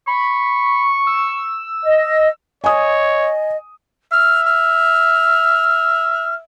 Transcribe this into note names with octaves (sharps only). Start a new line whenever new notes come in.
B5 C#6
E6
D#5
C#5 D#5 G#5 D#6
E5 F6
F6